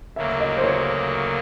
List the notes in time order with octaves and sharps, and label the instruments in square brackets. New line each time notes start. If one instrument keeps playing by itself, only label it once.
[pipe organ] D2 C#3 F#3 A#3 [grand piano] E5
[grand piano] D#5
C5
C#5